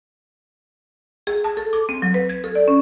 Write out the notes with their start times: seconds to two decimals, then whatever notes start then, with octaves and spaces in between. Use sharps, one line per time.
1.27 G#4
1.44 A5
1.57 A4
1.73 D6
1.89 C4
2.02 F#3
2.14 B4
2.29 G#6
2.44 A4
2.55 D5
2.68 C#4